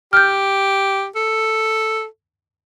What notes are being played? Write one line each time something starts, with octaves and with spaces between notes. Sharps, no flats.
G4 F6 G6
A4